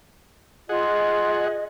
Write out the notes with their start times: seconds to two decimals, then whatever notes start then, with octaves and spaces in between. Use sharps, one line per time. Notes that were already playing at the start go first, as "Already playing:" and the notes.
0.69 F4 G#4 D#5 F#5